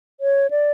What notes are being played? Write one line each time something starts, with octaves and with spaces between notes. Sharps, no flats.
C#5
D5